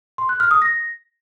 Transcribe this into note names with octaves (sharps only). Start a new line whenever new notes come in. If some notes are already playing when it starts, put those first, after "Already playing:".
C6
F#6
F6
D#6
A#6